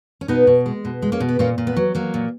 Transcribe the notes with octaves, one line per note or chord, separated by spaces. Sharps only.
C#4
B2 B3 D#4
B2
G#3
B2
G#3
A#3 C#4
B2
B3
A#2 A#3 C#4
A#2
B3
F#3
F#3 A#3
A#2